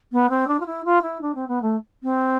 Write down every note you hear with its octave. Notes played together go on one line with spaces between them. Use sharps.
B3
C4
D4
F4
E4
F4
E4
D4
C4
B3
A3
C4